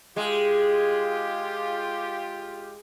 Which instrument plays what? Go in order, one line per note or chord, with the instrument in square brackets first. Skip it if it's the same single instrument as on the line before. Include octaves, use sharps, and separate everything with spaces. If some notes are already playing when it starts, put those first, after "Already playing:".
[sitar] G#3 [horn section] F4 G4